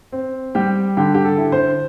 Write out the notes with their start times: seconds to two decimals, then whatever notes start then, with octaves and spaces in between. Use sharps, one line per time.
0.12 C4
0.55 G3 G4
0.97 D3 G4
1.14 G4
1.25 A4
1.38 E4
1.52 C5